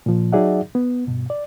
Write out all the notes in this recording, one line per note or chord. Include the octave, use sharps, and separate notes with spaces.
A#2 F3
F#3 D#4 G#4 D5 E5 F#5
B3
G2 B2
D5